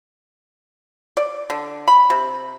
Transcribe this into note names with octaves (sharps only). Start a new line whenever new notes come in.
D5
D3
B5
C3